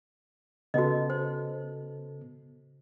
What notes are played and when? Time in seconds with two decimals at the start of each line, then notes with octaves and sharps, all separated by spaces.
0.74 C#3 B3 F#4 A4 D#5
1.10 C5